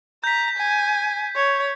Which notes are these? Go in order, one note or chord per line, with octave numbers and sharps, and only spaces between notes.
A#5 G6 B6
G#5
C#5